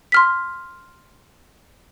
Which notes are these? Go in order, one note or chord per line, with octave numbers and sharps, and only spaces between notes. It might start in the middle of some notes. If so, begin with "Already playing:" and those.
C6 F6 B6